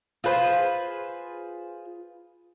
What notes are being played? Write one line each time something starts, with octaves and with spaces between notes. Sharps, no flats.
F4 G#4 B4 C5